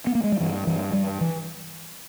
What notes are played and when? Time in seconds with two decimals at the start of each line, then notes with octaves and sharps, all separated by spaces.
0.07 B3
0.15 A#3
0.24 G#3
0.32 G3
0.40 G2 E3
0.67 G2 E3
0.93 G2 G3
1.21 E3